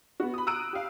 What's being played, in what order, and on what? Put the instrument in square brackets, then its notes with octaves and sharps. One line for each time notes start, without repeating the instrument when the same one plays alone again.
[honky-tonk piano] B3 F#4
B5 D#6
A#5 E6 F#6 D7 D#7
G4 F5